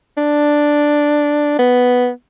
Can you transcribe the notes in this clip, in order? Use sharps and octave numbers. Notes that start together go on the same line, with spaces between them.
D4
B3